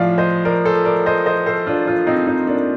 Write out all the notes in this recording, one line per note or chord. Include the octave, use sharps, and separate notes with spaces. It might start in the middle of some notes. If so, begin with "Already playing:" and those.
Already playing: A2 F3 D5 F5
C5 D#5
A#4 D5
A4 C5
A#4 D5
C5 D#5
C5 D#5
A4 C5
D4 F4
D4 F4
C4 D#4
C4 D#4
A#3 D4